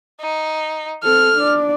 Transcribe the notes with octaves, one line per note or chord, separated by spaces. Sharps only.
D#4
C4 A4 F6
D4 D5